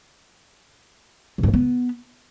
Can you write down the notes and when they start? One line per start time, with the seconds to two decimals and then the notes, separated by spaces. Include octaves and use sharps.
1.38 B2
1.43 G2
1.48 C#3
1.54 B3